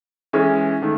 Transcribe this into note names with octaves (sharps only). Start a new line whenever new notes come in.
E3 G#3 C#4
D#3 A3